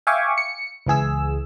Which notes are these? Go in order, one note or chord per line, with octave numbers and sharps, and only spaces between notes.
E5 F5 G5 G#5 C#6 D6
C#7
C#2 E3 G#4 E6